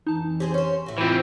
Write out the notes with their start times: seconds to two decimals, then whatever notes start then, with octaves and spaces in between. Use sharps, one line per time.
0.07 F2 E3 D#4 A5
0.40 C4 G4 G#4 C5
0.54 C#4 C5
0.86 A2 A3 F#4
0.98 E3 C4 F4 C5